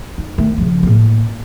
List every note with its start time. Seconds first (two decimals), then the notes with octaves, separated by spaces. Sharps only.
0.18 D#4
0.38 D#3 A3
0.58 C#3 F3
0.83 A2 A#3